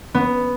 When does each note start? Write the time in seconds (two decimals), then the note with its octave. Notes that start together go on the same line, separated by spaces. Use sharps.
0.14 B3